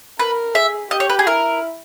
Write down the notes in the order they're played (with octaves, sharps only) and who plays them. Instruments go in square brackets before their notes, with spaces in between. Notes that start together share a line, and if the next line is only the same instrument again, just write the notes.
[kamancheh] A#4 [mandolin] B4
[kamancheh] G#4 [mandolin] E5
[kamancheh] G4 [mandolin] D#5
[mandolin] C#5
B4
G#4
[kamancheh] E4 [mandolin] A#4